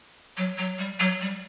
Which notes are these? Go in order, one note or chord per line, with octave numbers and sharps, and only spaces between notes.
F#3
F#3
G3
F#3
G3